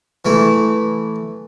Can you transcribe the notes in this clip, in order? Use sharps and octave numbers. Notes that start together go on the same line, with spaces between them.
E3 A3 E4